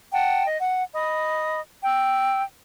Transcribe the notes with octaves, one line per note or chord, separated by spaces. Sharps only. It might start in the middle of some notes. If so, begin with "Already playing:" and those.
F#5 G5 A5
D#5
F#5
D#5 B5 D#6
G5 E6